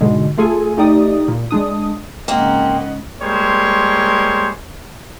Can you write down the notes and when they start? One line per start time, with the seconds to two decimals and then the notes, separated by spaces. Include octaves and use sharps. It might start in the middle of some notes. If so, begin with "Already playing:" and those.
0.01 G#2 B2 D3 G#3
0.38 A3 F4 G#4 A4 G#5
0.77 A3 D#4 G4 D5 D#6
1.28 A#2
1.51 G#3 D4 D#6
2.28 G#2 C#3 A#3 C4 D#5 F#5
3.21 G3 G#3 A#3 C5 C#5